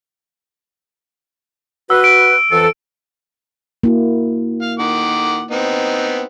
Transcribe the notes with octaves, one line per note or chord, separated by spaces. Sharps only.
F#4 B4 E6
D7
F2 E3 A4
A#3 E4 F#4
F5
D#3 F#5 D6
B3 C4 D#4